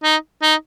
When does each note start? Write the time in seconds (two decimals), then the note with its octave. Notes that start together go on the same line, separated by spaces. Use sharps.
0.03 D#4
0.42 D#4